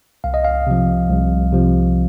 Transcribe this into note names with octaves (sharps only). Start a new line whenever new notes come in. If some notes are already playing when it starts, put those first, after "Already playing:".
C2 F5
D#5
F5
C3 F3
C2
C3 F3